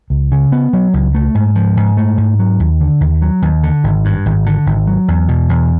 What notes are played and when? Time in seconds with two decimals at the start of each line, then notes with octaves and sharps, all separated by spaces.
0.10 C#2
0.32 C#3
0.52 B3
0.73 F#3
0.93 C#2
1.14 A3
1.35 G#2
1.55 F3
1.77 G#2
1.97 A3
2.18 G#2
2.39 F#3
2.60 D#2
2.80 D3
3.01 D#2
3.22 F#3
3.42 D#2
3.63 D3
3.84 G#1
4.05 G2
4.26 G#1
4.46 D3
4.66 G#1
4.87 F#3
5.08 E2
5.28 B2
5.49 E2